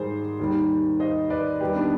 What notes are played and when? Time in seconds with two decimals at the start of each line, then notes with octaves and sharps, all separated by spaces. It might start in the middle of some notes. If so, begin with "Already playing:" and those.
Already playing: G#2 D#3 G3 G#4 C5
0.39 D#2 D#3 G3
1.00 C5 D#5
1.30 B4 D5
1.60 D#2 D#3 G3 G4 B4
1.76 B3 D4